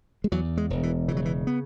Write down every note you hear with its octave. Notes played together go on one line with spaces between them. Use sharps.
G#3
E2 F#3
G#3
E1
E3
C#3 E3
F#3
E3
B3